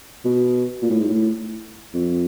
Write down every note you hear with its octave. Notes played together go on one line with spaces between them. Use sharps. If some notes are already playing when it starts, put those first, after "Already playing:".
B2
A#2
A2
G#2
A2
F2